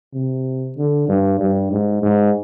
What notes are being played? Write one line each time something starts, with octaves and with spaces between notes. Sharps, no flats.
C3
D3
G2
G2
G#2
G#2